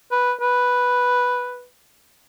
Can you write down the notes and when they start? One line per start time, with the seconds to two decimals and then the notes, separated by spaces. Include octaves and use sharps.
0.12 B4
0.42 B4